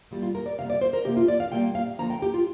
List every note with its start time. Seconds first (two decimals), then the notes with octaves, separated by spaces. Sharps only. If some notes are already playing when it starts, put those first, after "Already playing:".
0.11 A#2 G3 A#3
0.22 F4
0.35 A#4
0.46 D5
0.58 C3 G3 A#3 F5
0.70 D5
0.81 C5
0.93 A#4
1.05 C3 A#3 G4
1.17 F4
1.28 D5
1.40 F5
1.52 A#2 G3 A#3 G5
1.75 F5
1.99 D3 F3 A#3 A#5
2.10 G5
2.22 G4
2.34 F4